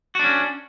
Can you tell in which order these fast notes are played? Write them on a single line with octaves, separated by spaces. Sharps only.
F#4 D4 C#4